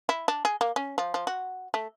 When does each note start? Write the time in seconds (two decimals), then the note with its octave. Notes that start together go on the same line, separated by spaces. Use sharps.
0.09 E4
0.28 D4
0.45 G#4
0.61 A#3
0.76 C#4
0.98 F3
1.14 F3
1.27 F#4
1.74 A3